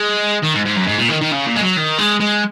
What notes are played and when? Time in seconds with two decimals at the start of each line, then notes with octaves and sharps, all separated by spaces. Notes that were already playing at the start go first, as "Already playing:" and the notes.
Already playing: G#3
0.43 D#3
0.54 G#2
0.66 G#2
0.77 F#2
0.88 G#2
0.99 A#2
1.10 D#3
1.22 D#3
1.32 C#3
1.47 A#2
1.56 G#3
1.62 F#3
1.76 D#3
1.98 G#3
2.20 G#3